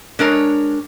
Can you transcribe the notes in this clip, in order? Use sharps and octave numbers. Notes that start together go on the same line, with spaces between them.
G#3 D4 A#4 C#5